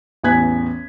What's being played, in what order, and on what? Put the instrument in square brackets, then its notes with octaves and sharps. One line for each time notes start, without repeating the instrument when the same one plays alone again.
[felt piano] A1 E2 G#5 F#6 G#6 B6